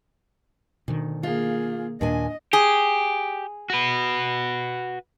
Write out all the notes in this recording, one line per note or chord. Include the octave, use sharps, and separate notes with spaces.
D2 B2 D#3
A#3 F4 G#4
D#2 A#2 D4 D#5 G#5
G4 G#4
F#4 B4